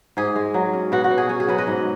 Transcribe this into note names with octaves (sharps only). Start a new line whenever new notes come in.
G#2 G#4
G#3
F#3
C#4
B2 F#4
F#4
B2
G#4
C#4 G#4
G#4
F#3 F#4 B4
B4 D#5
G#2